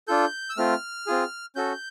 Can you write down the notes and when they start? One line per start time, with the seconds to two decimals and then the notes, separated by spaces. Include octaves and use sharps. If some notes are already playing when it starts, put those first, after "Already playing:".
0.08 D4 F4 A4 G6
0.50 E6
0.57 A3 C4 F4 F6
1.07 C4 F4 G#4
1.56 C#4 F#4 A4 G6